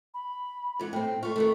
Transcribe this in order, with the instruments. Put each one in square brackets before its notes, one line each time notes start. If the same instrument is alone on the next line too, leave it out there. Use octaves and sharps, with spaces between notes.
[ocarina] B5
[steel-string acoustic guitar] G#2 E3 F#5
[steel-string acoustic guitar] A2 C4 [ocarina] G5
[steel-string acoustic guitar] A3 F4 [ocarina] C#6
[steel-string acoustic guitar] D#3 E3 A3